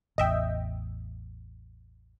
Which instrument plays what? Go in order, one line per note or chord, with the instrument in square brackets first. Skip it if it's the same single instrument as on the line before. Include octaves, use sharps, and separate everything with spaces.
[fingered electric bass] A1 E2 [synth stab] D#5 E5 G5